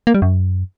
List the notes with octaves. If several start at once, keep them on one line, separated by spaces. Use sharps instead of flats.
A#3
G3
F#2